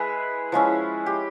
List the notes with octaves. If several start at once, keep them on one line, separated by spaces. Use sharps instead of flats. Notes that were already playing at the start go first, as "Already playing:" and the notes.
Already playing: G#3 E4 G#4 B4
F3 G#3 C#4 E4
G4